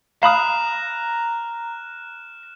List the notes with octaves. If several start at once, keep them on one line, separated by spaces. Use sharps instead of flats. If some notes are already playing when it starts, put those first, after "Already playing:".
F5 A#5 B5 D#6 F6 F#6 E7